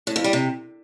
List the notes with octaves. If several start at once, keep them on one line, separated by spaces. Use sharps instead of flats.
A2
F2
G3
C3